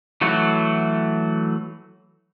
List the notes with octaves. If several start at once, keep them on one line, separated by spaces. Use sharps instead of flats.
E3 F#3 A3 F#4